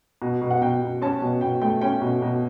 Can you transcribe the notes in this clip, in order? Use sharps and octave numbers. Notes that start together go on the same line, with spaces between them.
B2
B2
F#5
B2 G5
B2
C#4 A5
B2
B2 G5
A3 G5
C#4 G5
B2
B2